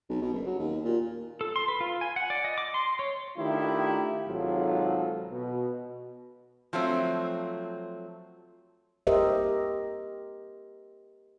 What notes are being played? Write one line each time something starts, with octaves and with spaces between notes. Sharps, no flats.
B1
B2
F#1
F#3
D#2
A#2
A4
C6
B4
F4
G#5
F#5
D5
D#5
D6
C6
C#5
D#3 A3 D4 E4 F4 G4
G#1 G#2 C3 F#3 F4 A4
B2
F3 F#3 A3 C4
G4 A#4 C5 D#5 E5